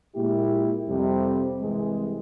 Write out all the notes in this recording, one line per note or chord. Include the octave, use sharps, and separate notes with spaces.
A#2 G#3 E4 G4
F2 C3 G3
C2 C3 E3 G#3